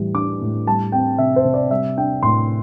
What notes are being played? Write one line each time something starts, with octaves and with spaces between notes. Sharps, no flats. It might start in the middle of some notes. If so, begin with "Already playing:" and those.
Already playing: A2 E3 G3
D4 D6
A2
G3 A5
C4 G5
C3 E5
C5
C3
D5
G3 E5
D4 G5
A2 C6